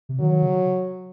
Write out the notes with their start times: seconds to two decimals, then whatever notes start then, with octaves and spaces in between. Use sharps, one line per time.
0.09 C3
0.20 D#3 F#3
0.32 D#3
0.43 C#3